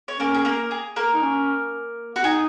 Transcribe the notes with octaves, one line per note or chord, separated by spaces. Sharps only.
C#5
A#3 C#4 A#4
G#4
A#3 A#4
G#4
A#3 A#4
D#4
C#4
F#4
D#4 G#4